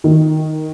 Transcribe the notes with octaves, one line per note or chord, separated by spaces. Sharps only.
D#3